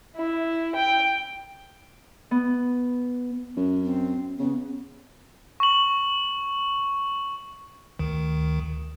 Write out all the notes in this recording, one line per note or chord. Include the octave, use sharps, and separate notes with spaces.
E4
G5
B3
F#2
C4
C#3 B3
C#6 F#7
D2 D#3